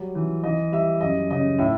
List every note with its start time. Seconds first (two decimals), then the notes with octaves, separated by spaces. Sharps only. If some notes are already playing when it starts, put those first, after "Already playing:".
Already playing: F#3 G3
0.15 E3
0.43 E3 D#5
0.72 G3 E5
1.01 F#2 D#5
1.30 C#3 D#5
1.58 A2 E5